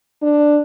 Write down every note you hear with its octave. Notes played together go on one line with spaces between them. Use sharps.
D4